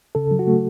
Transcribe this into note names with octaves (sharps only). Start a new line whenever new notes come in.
C#3 A4
F#3
F#4
A3